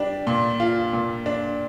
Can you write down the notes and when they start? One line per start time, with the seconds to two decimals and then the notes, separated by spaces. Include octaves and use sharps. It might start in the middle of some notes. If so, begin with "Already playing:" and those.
Already playing: G3 D4
0.27 A#2
0.60 F4
0.93 A#2
1.26 D4